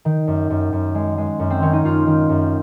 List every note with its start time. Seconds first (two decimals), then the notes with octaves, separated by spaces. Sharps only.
0.05 D#3
0.28 F#2
0.50 F#2
0.73 F#2
0.95 G#3
1.18 G#3
1.40 F#2
1.50 C4
1.62 D#3 C#4
1.73 D#4
1.84 F#2 F4
2.07 D#3
2.29 F#2